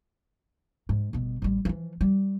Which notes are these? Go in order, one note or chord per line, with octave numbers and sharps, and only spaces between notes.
G#2
G1 B2
A1 G3
E3 F3
G3